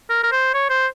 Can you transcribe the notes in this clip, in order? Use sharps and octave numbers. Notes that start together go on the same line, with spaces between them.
A#4
A#4
C5
C#5
C5